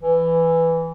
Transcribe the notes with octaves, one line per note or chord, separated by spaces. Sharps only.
E3